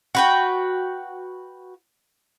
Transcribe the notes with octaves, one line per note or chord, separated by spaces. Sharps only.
F#4 B4 G5